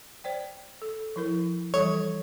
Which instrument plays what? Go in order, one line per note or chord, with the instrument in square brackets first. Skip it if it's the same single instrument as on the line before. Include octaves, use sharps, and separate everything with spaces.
[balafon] C5 D5 G5
A4
F3 E4 A#4
[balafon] E3 G3 A4 [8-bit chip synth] C#5